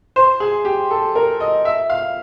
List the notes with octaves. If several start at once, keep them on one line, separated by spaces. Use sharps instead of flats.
C5
G#4
G4
A4
A#4
D#5
E5
F5